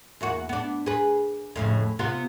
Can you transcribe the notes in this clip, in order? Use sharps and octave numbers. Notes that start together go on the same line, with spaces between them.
E2 A#3 F#4
B3 D4
G#4 B4
F2 A2 C#3
C3 B3 F4